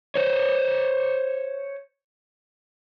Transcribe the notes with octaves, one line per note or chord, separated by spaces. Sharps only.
C5 C#5